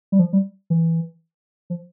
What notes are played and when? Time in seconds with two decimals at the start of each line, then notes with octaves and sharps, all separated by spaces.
0.12 G3
0.19 F3
0.33 G3
0.70 E3
1.70 F3